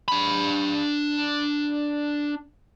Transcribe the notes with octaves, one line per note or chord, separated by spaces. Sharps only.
D4 B5